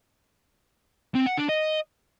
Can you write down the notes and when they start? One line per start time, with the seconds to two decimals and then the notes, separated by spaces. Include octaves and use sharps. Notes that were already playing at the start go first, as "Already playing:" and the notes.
1.14 C4
1.26 F#5
1.38 D4
1.49 D#5